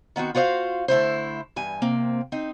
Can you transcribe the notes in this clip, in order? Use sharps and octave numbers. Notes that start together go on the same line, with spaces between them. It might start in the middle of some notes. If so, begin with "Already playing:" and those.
D#3 B3 C4 F#4
F4 F#4 C5 D5 F5
D3 A3 E4 C5
E2 G2 G#5
C3 A#3 C4
C4 D#4